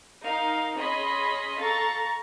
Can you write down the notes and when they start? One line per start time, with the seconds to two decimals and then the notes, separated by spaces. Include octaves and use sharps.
0.24 D#4 A#4 F5
0.77 C#4 G#4 D#5 B5 C6
1.60 A4 F5 A#5 C#6 A6